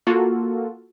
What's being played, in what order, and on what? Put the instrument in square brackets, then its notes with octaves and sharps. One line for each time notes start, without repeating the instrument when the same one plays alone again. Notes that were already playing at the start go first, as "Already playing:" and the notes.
[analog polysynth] A#3 F4 F#4 A4